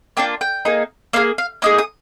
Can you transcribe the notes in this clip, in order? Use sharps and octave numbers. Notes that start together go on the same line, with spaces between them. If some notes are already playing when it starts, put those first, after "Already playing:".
A#3 D4 F4 G5
G5
A#3 D#4 G#4
A#3 D#4 G#4 F5
F5
A#3 D#4 G#4 D6
D#6